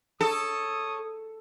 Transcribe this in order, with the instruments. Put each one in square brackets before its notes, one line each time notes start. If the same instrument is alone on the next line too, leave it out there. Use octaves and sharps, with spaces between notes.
[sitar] A4 [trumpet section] C#5 D#6